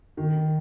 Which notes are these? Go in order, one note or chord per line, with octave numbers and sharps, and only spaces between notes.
D#3